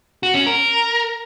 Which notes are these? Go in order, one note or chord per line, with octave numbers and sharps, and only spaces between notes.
F#4
C#4
A#4